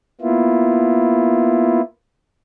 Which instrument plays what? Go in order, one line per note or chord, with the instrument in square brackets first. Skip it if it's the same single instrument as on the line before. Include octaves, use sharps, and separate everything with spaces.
[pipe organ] A#3 B3 E4 F4